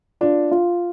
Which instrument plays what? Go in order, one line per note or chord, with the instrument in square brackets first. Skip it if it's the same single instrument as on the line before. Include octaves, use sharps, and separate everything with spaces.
[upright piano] D4 [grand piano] F4
[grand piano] F4